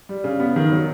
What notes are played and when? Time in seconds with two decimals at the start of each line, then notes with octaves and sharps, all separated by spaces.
0.09 G3
0.24 C#3
0.40 B3
0.56 D#3
0.71 F#3